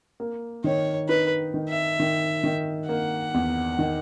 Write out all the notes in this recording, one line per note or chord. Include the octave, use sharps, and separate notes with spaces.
A#3
D#3 C#5
D#4 B4
D#3
E5
D#3
D#3
A#3 F#5
E2
D#3